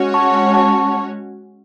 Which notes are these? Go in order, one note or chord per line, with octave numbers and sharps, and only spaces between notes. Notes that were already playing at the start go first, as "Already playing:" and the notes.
Already playing: G#3 C#4 F#4 C#5
A5 C#6
A5 C#6